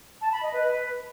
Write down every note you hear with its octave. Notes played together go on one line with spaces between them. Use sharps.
A5
B5
D#5
B4